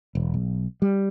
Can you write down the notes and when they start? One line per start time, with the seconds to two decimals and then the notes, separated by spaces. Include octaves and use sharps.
0.15 E1
0.34 B1
0.82 G3